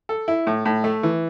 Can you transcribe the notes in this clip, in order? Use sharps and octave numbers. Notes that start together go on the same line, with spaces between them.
A4
E4
A2
A2
A3
E3